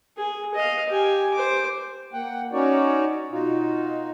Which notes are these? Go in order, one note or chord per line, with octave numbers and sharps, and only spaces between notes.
G#4
D#5 F5
G4 G#5
C5 D6
A#3 F#5 G5
C#4 D#4 F#4 C#5 D5
B2 D#4 F4 F#4